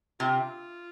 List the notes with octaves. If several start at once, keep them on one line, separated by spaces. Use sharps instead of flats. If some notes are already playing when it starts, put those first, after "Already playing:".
C3 F4